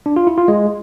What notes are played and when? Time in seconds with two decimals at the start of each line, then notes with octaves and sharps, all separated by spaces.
0.06 D4
0.16 F4
0.27 E4
0.38 F4
0.48 G#3